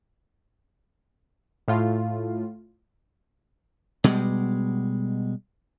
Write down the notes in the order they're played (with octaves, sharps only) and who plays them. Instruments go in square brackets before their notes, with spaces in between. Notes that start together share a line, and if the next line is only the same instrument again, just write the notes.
[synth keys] A2 F4
[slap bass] B2 G3 G#3